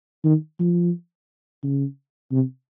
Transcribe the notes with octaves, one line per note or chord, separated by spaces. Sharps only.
D#3
F3
C#3
C3